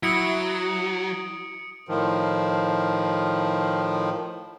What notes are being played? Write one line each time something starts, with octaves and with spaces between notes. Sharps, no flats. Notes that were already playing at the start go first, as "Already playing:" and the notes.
F#3 E4 D#6 C#7 D7
A2 D#3 F3